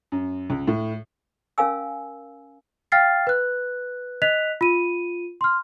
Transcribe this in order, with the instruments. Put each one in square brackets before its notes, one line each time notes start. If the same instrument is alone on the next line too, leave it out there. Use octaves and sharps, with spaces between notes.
[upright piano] F#2
C#2
A2
[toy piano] C#4 A#4 F5 G#5 E6
[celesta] F5 G5 F6 A6 C7
B4 F#6
D#5 F#6 B6 F7
F4 D#7
C6 F6